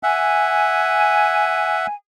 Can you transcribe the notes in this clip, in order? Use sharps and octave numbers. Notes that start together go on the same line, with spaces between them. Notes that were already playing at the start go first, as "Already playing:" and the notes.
E5 F#5 G#5